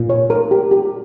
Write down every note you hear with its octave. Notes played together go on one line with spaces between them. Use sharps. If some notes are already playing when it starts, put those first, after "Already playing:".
Already playing: A#2
C#5
A#4
G4
G4